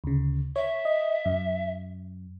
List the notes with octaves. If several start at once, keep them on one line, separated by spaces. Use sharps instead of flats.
D2 C#3
C#5 E5
D#5
F#2